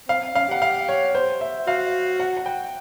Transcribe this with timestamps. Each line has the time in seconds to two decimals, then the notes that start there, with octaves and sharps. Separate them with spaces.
0.08 C4 F5
0.21 C4
0.34 C#4 F5
0.48 G4 F#5
0.62 F5
0.89 C#5
1.15 C5
1.41 E5
1.67 F#4 F5
2.20 F#5
2.37 F#5
2.46 G5